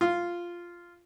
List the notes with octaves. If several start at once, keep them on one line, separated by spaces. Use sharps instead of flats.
F4